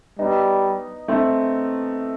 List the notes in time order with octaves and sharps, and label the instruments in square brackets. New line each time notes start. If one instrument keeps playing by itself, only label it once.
[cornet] G3 [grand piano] B3 D#4
[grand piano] A3 C4